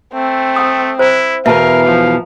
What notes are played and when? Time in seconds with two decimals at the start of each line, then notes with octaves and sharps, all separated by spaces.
0.14 A3 C4
0.56 G5 D#6
0.99 E4 C5
1.46 E2 B2 A#4 E5 F5 A5
1.86 F3